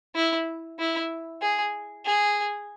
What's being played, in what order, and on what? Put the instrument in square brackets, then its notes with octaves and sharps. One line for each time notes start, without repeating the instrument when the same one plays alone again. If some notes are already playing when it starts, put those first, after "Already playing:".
[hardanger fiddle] E4
E4
G#4
G#4